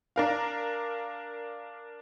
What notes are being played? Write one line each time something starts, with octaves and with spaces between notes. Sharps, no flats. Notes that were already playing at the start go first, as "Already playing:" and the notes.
D4 A#4 F5